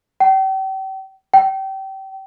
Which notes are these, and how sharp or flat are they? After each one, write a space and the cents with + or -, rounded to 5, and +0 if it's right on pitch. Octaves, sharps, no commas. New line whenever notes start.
G5 -40
G5 -30